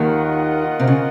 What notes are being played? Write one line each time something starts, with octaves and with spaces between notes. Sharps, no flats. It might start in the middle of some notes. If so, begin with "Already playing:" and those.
Already playing: D#2 D#3 F4 A#4 D#5 F#5
C3
C#3